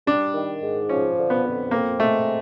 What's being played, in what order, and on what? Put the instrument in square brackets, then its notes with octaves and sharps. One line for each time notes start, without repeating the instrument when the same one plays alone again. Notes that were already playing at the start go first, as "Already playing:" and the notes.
[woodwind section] G3 [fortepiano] D4
[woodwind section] D#3
G#2
[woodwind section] F3 [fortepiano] C#4
[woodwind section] D3
[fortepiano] B3
[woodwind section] F2
[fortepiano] A#3 [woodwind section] C4
[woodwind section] G#3 [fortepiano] A3